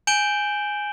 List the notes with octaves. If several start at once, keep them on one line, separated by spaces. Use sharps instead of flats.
G#5 G6 D7 E7 F#7 G7